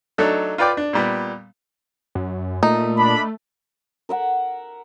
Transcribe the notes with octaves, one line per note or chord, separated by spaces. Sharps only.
F#3 A3 D4 D#4 A4
F4 B4 D5 G5 D6
D4
A#2 G3 B3
F#2
A#2 A3 D#4
D4 B5
A#4 E5 F#5